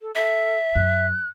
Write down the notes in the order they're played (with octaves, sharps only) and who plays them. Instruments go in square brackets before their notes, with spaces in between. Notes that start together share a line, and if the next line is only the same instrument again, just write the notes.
[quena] A4
[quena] A4 [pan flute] E5
[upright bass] F#2 [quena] F#6